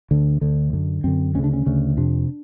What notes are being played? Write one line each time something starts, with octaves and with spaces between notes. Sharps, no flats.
D2 D3
D2 D3
F#2 D3
F#2 D3 C4
D2 C#3 C#4 D4
C#4
D2 C#3
F2 C3 D4